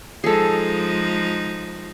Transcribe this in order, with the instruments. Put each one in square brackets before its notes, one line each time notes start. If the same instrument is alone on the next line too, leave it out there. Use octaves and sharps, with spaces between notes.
[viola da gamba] F3 G#3 D#4 [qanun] G#4 A4